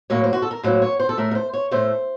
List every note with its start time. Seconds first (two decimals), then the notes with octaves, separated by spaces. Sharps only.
0.10 A2 F#3 A#3 C#5
0.24 C5
0.33 F#4
0.42 A4
0.51 A#4
0.63 A2 F#3 A#3 C5
0.82 C#5
1.00 C5
1.09 A4
1.17 A2 A3 A#4
1.31 A#4
1.35 C5
1.53 C#5
1.71 A2 A3 C5